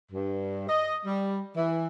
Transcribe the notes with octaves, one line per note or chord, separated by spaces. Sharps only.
G2
D#5
G3
E3